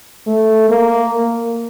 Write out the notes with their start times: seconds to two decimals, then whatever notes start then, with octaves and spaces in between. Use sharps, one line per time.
0.27 A3
0.69 A#3